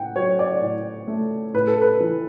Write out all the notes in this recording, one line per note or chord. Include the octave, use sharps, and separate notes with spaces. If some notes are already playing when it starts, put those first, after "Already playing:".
Already playing: A2 F#5 G5
F#3 C#5
D5
A2
A3
A2 B4
A4
B4
E3